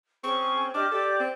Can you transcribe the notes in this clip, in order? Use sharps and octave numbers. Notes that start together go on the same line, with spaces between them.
C4 C#4 G#4 C#6
D4 G4 D#5 D6 F6
G4 A4 D5
C4